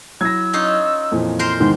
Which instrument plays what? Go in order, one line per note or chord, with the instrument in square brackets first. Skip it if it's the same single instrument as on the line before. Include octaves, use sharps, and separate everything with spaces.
[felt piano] F#3 E4 [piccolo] E6 [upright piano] G#6 A#6
[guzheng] C#4 D#4 F4
[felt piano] F2 A#2 E3
[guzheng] A#4 C5 [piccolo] C6
[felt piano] E2 C3 [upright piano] G#2 D#3 [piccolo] C6